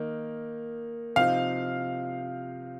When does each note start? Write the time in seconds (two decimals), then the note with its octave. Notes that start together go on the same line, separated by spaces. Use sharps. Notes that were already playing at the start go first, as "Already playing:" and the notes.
Already playing: D#3 A#3 D#4
1.16 C3 F3 D#4 C5 F5